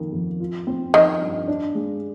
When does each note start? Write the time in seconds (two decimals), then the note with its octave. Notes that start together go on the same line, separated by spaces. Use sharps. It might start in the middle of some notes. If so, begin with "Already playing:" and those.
Already playing: F2 D#3 A#3
0.12 F2
0.40 F4
0.67 C4
0.93 D#3 F3
1.22 G2
1.48 D4
1.75 G#3